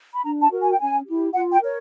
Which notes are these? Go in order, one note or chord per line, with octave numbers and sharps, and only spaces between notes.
B5
D4 A#5
A5
F#4 A#4
G#5
G5
C#4 G#5
E4 G4
F4 F#5
G5
A#4 C#5